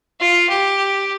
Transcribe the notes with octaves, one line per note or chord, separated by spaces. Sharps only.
F4
G4